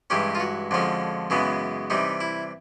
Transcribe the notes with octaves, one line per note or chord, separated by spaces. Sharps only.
G2 E3 G#3 C#4 G4
F4
F#4
F2 D3 F3 G#3 C#4
F#2 C#3 E3 G#3 B3
C3 E3 G3 D#4
E4